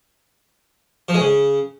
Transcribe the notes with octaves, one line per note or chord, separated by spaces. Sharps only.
F3
G#3
C#3